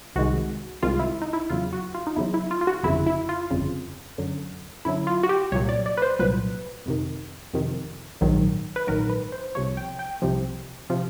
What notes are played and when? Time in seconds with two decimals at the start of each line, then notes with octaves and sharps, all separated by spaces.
0.16 C2 C3 D#3 G#3 F#4
0.83 C2 C3 D#3 G#3 F4
0.99 E4
1.22 D#4
1.33 E4
1.50 E2 C#3 F#3 F4
1.73 F#4
1.95 F4
2.07 D#4
2.16 E2 C#3 F#3 E4
2.34 E4
2.51 F4
2.61 F4
2.67 F#4
2.83 G1 F2 C#3 E4
3.06 E4
3.29 F4
3.50 G1 F2 C#3
4.18 F#2 D3 F#3
4.85 F#2 D3 F#3 E4
5.07 F4
5.23 F#4
5.29 G4
5.52 C2 A#2 F#3 C#5
5.69 D5
5.86 D5
5.97 B4
6.02 C5
6.19 C2 A#2 F#3 B4
6.86 F2 C3 D#3
7.54 F2 C3 D#3
8.21 A#1 G#2 D#3 F#3
8.76 B4
8.87 A#1 G#2 D#3 F#3 A#4
9.10 B4
9.32 C5
9.55 C2 C3 F3 C#5
9.77 G5
9.99 G5
10.22 C2 C3 F3
10.90 C3 F3